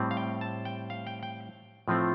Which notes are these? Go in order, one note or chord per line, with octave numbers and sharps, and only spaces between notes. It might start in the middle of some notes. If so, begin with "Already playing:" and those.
Already playing: A2 G3 C4
F5
G5
A5
G5
F5
G5
G5
A2 F3 A3 C4